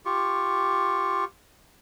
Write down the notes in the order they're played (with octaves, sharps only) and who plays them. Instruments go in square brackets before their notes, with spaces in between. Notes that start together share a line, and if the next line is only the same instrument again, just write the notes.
[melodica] F4 G4 C#6